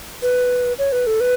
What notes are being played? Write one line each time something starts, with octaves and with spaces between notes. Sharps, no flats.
B4
C#5
B4
A4
B4